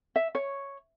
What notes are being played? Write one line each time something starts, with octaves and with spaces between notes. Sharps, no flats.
E5
C#5